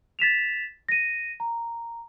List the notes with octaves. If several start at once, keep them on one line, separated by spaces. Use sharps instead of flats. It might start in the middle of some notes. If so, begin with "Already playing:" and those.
A6 B6 E7 F7
A#6 D#7
A#5